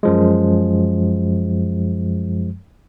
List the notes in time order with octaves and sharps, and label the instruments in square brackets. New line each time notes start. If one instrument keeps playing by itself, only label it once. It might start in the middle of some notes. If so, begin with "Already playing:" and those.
[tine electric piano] F#2 F3 G#3